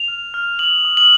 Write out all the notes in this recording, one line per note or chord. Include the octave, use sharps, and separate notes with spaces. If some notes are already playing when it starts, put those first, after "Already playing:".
Already playing: F7
F6
F6
D#6 F#7
D#6
F#7